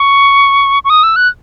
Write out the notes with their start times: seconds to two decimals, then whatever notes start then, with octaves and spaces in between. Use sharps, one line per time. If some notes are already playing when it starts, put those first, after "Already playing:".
Already playing: C#6
0.85 C#6
0.90 D#6
1.03 E6
1.16 F#6